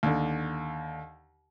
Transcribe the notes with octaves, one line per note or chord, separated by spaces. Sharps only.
D#2 D3